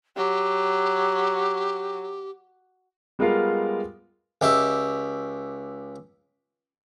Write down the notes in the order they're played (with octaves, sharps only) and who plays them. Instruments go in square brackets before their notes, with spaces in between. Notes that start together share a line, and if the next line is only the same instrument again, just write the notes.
[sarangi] F#3 [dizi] G4
[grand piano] G3 G#3 B3 F4 A#4 F5
[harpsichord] C#2 G4 E5